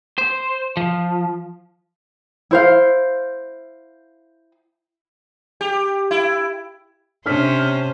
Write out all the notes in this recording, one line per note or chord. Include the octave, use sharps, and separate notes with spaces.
C5
F3
E4 C5 F5
G4
E4
C3 C#4 D4 C5 F6 B6